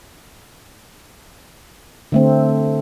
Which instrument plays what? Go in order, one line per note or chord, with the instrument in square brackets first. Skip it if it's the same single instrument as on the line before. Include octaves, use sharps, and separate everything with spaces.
[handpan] D3 A3 C4